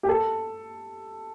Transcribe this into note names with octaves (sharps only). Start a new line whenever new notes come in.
G4
A4